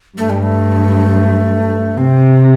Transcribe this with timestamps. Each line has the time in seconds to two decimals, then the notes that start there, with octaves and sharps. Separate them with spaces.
0.17 G2 A3
0.30 G3
0.42 A3
1.97 C3 C4